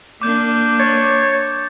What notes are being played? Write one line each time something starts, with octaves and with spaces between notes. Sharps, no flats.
A#3 D4 D6 G6
C#5 A6